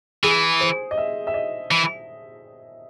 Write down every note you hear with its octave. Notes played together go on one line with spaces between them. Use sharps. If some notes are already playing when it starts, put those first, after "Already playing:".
E3 G#4
C5
D#5
E5
E5
D#5
E3